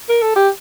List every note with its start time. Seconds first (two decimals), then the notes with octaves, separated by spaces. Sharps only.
0.09 A#4
0.22 A4
0.36 G4